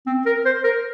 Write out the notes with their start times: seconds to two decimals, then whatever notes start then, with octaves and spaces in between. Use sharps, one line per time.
0.07 C4
0.26 A#4
0.45 C5
0.64 A#4